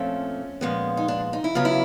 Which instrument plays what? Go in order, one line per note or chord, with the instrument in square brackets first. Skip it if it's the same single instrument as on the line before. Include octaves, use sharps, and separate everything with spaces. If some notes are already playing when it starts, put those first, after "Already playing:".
Already playing: [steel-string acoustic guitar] A#2 F3 A3 C4 C#4
A#2 F3 G#3 B3
D#4
D4
D#4
E4
C#3 F#3 B3 F4
E4